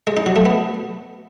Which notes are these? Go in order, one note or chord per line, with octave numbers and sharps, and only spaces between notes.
G#3
D#4
F#3
A3
B3